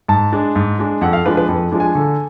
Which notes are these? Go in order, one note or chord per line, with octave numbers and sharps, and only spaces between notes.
G#2 A5
G#3 D4
G#2
G#3 D4
F2 F#5
F5
F3 G#3 D4 B4
B4
F2
F3 G#3 D4
G#5
D3